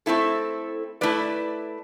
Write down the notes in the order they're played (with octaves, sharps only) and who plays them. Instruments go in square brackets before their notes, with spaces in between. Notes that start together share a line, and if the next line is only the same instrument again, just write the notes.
[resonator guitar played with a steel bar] A3 C4 E4 A4
A3 E4 B4 D5